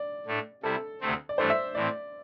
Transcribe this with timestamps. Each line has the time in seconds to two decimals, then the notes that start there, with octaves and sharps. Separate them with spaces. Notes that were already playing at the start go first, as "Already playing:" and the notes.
Already playing: D5
0.26 A2 A3 D4
0.63 C3 G3 E4 A4
1.00 D2 C3 A3 C4
1.29 D5
1.37 G2 E3 A3 D4 C5
1.50 E5
1.75 A2 E3 C4 D5